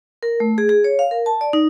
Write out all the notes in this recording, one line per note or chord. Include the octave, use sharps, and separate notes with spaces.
A#4
A3
G#4
G#4
C#5
F5
A#4
A5
D5
D#4